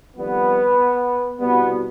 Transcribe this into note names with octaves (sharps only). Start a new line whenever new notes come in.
F2 D#3 G3 B3
C2 B2 G3 B3